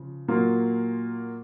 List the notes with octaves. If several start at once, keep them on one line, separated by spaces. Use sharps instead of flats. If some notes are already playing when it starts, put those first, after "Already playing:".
Already playing: C#3 F3
A#2 F#3 A#3 F4